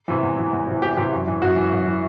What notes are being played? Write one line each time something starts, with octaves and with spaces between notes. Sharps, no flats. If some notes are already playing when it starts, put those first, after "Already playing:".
C3 E3
E2
C3 E3
E2
C3 E3
E2 G4
C3 E3 G4
F#2
E3
F#2 F#4
E3
F#2
E3